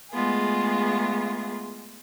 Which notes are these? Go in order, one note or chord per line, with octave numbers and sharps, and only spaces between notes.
G#3 A3 B3 F4 G#4